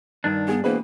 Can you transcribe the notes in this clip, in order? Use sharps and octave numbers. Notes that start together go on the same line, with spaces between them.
G2 D#3 D4
B3 G#4
E1 A#3 G#4 B4 C5